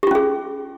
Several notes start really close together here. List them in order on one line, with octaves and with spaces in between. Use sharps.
G4 F4 C#4 G#4